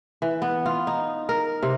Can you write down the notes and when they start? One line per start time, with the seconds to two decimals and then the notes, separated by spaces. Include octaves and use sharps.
0.22 E3
0.42 B3
0.66 F4
0.87 D#4
1.29 A#4
1.63 C3